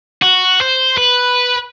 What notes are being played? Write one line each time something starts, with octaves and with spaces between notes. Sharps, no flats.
F#4
C5
B4